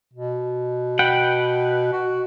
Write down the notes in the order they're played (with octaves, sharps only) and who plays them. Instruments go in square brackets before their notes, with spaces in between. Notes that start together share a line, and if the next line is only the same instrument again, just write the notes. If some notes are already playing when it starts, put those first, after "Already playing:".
[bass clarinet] B2
[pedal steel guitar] B4 F#5 G5
[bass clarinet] F#4